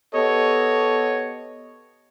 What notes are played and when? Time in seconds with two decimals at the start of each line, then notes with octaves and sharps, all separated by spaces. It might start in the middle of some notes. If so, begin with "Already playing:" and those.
0.13 B3 G4 A4 C#5 D#5